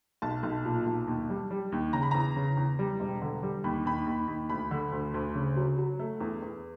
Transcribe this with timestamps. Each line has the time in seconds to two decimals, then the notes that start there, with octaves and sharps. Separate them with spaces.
0.22 B1 A5
0.43 B1
0.65 A#2
0.87 B1
1.08 D#2
1.29 G3
1.51 G3
1.72 D#2
1.93 C#3 A#5
2.03 B5
2.11 E2 A#5
2.36 C#3
2.57 E2
2.79 G3
3.00 E1
3.22 D3
3.43 G3
3.64 D#2 B5
3.86 D#2 B5
4.07 D#2
4.28 D#2
4.50 D2 B5
4.71 D3
4.92 D2
5.14 D2
5.35 C#3
5.57 F#3
5.78 F#3
5.99 A3
6.21 E2
6.42 E2